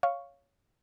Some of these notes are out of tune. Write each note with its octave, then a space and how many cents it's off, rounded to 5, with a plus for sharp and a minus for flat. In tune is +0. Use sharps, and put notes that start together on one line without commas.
C#5 +5 F5 +0 C#6 +0